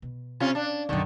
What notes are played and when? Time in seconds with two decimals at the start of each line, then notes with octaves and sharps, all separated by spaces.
0.02 B2
0.40 C3 C#4 F4
0.55 D4
0.89 B1 F#2 D3 D#3